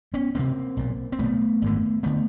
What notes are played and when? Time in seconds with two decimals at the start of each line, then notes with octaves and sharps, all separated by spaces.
0.14 B3 C#4
0.35 D2 C3 A#3 C4
0.77 B1 A#2
1.12 C4
1.19 B1 A#2 A3 B3
1.62 G#1 F#2 D3
2.03 D3 A3 B3